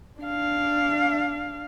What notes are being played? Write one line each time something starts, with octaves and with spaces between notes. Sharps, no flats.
D4 F5